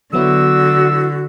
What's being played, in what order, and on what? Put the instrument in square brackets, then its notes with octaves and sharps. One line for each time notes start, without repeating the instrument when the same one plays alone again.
[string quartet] D3 [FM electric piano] F#3 B3 E4 [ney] F#4 [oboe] E6